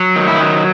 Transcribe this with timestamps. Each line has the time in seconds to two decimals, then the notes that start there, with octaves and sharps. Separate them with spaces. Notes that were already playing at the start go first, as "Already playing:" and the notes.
Already playing: F#3
0.16 D#3
0.28 E4
0.41 F#3